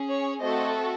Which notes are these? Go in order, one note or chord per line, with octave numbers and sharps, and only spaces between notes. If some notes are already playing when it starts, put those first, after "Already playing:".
Already playing: C#4 G#4
C#5
A3 C4 F#4 A4 C5 D#5